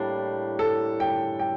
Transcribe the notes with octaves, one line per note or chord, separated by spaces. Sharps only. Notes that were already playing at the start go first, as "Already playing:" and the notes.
Already playing: A2 G3 A#3 D4
A4
G5
G5